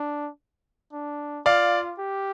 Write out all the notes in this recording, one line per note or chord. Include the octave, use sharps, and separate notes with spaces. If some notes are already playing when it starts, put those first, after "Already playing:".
Already playing: D4
D4
F4 D5 F5
G4